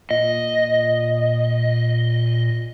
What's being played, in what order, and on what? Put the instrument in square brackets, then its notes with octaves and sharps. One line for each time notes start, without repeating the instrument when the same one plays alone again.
[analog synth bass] A#2 [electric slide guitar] D#5